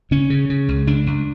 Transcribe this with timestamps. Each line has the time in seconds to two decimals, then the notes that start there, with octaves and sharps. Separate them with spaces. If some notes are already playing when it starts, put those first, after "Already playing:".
0.11 C#3 C#4
0.30 C#3
0.50 C#3
0.68 C#2
0.87 C#2 D4
1.06 C#2